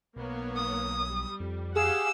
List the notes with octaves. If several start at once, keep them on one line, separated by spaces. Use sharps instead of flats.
B1 A#3 B3 C#5
D#6
G3
F2
G4 G#4 F5 F#5 E6